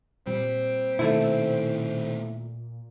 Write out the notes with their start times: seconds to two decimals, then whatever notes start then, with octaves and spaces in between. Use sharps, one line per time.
0.27 A#2 G3 C4
0.99 B2 D#3 A3 E4